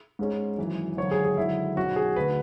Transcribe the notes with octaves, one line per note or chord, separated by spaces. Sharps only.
G#2 G#3 C#4
G#1 F#2 E3
G#1 F#2 D3 C#5
G#4
G#4
G#1 F#2 D3 E4
B1 B2 F#3 C#4 F#4
G#4
D2 D3 A3 B4